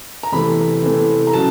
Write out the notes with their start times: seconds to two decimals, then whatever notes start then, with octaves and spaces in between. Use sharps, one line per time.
0.23 A#5
0.32 E2 C3 E3 A3 C4 B5
0.82 E2 C3 E3 A3 C4
1.27 A#5
1.33 C#3 F#3 A5